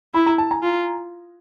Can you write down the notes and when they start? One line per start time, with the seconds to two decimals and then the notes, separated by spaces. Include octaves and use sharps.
0.14 E4 B5
0.26 A#5
0.38 A5
0.51 G#5 A#5
0.63 F4